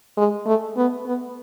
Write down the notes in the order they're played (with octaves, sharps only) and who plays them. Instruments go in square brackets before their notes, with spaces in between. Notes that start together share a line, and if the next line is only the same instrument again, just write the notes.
[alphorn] G#3
A3
B3
B3